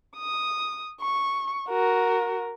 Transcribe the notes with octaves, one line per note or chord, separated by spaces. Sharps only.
D#6
C#6
F#4 A#4